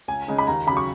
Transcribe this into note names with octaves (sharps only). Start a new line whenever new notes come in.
C#2 G#5
C#3 G#3 D#4
B5
D#2 A#5
C#3 F#3 B5
C#6